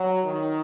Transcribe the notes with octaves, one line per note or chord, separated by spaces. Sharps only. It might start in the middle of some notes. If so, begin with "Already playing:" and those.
Already playing: F#3
D#3